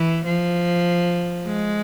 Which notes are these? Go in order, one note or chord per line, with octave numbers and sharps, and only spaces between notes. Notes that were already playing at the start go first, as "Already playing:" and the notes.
Already playing: E3
F3
G#3